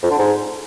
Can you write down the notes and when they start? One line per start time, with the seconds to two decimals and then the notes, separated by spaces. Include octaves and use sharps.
0.03 F2
0.11 D3
0.19 G#2